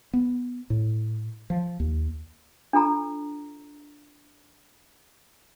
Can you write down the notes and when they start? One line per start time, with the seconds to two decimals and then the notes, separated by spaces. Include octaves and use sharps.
0.13 B3
0.70 A2
1.50 F3
1.80 D#2
2.73 D4 F4 A4 A#5